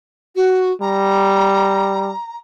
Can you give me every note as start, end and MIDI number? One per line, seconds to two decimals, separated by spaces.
0.35 0.71 66
0.81 2.12 55
0.81 2.35 82